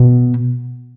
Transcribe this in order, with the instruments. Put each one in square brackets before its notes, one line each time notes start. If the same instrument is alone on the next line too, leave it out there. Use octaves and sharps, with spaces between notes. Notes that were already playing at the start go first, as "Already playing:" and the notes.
Already playing: [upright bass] B2